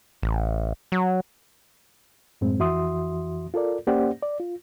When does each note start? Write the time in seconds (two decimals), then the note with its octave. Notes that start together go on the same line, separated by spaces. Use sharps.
0.23 A1
0.92 F#3
2.41 F#2 A2 G#3 C4
2.59 F2 E3 F#4 E5 C6 D#6
3.54 F4 A4 A#4 D5
3.87 A#3 C#4 G4 C5 D5 F#5
4.23 D5
4.40 F4